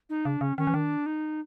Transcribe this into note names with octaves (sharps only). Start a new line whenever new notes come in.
D#4
C#3 D4
C#3 C#4
D#3 C#4
E3
D#3 D4
D#4